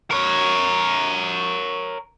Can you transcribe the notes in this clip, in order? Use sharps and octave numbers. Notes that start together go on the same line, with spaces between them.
A#4 C#5